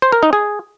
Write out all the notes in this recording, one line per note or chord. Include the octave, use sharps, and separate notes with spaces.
C5
A#4
D#4
G#4